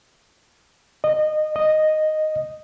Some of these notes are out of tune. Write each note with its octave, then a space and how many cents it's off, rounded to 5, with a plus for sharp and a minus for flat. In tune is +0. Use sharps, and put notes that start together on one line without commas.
D#5 -20
D#5 -5